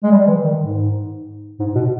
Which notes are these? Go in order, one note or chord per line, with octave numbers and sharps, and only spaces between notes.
G#3
G3
E3
D#3
G#2
G#2
B2